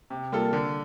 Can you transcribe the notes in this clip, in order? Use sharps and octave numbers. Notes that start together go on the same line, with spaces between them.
C3
G3 A#3 F4 A4
D3